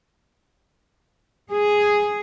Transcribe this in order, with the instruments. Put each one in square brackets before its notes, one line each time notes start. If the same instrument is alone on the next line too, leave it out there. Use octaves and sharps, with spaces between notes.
[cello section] G#4